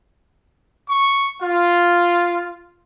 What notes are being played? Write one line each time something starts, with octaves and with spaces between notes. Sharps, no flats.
C#6
F4